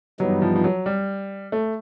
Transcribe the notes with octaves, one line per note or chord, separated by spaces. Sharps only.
G2 E3 F#3 G3 B3 D#4
F3
F3
F#3
G3
A3